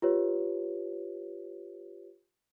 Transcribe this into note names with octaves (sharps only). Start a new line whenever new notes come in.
F4 G4 B4 C#5